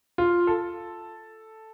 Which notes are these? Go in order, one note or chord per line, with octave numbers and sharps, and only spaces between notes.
F4
A4